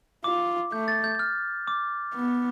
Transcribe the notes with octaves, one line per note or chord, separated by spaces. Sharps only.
F4 D6
A3 G6
A6
G6
G6
F6
D6
B3